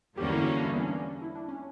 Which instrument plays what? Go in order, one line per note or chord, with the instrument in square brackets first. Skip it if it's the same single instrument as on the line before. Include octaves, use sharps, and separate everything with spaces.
[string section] E2 D3 G3 A#3 C#4 [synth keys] G4
[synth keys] E4
F#4
D4
E4
B3
C#4
D4
E4
D4
C#4